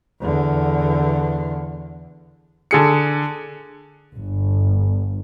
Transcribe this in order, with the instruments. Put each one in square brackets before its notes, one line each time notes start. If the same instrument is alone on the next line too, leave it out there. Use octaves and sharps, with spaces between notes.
[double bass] E2 D3
[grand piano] D3 G#4 C#7
[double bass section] G1